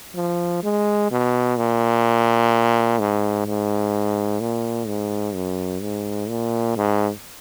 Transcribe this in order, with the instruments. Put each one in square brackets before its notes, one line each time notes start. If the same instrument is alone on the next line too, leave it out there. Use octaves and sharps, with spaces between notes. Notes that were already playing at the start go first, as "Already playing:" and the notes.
[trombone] F3
G#3
B2
A#2
G#2
G#2
A#2
G#2
F#2
G#2
A#2
G#2